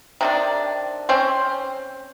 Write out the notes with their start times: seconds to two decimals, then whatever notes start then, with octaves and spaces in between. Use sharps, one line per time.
0.21 C3 D#3 D4
1.09 C4 C#4 C5